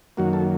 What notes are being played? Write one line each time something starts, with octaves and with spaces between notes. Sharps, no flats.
F#2 D#3 F#3 A#3 F#4
A4